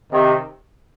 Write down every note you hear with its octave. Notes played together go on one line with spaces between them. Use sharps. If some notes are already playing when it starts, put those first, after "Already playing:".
C3 D#3